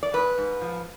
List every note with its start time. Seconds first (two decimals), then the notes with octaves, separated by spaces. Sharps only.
0.03 D5
0.13 G#2 B4
0.38 G#2
0.61 F3